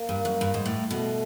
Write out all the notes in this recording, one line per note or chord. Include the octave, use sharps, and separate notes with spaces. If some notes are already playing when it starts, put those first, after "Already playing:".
Already playing: A#3
G2
F#2
G2
G#2
A2
B2 A3